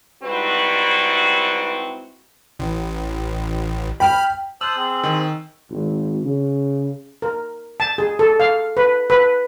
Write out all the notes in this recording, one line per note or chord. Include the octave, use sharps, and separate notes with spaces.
G#2 G3 C4 E4 F#4 B4
A1
G5 B5 F6
C5 A5 D#6 E6 F#6 F#7
C4 G#4
D#3
G#1
C#3
A#4
A5
G#4
A4
F5
B4
B4